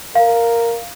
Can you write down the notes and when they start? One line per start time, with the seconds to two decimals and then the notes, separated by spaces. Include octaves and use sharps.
0.15 A#4 F5